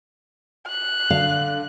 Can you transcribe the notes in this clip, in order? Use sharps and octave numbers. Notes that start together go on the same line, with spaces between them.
F#6
D3 F5